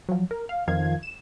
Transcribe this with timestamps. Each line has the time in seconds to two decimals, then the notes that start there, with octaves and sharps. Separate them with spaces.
0.09 F3 F#3
0.31 A#4
0.49 F5
0.68 F2 D#3 F3 F5 G#6
1.03 E7